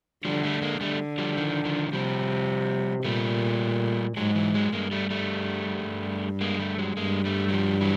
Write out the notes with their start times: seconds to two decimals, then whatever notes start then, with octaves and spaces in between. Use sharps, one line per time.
0.25 D3 F3 G3
0.43 G3 A3
0.62 G#3 A#3
0.81 D3 G3 A3
1.18 F3 G3
1.36 D#3 F3
1.65 D#3 F3
1.92 C3 F3 G3
3.05 A#2 G3 A3
4.17 G#2 F#3 G#3
4.35 E3 F#3
4.54 F#3 G#3
4.73 G2 G#3 A#3
4.91 G3 A3
5.10 G3 A3
5.85 G2
6.41 G#3 A#3
6.59 G3 A3
6.78 F#3 G#3
6.97 G2 G#3 A#3
7.25 G3 A3
7.48 F#3
7.53 F3 G3
7.81 E3 F#3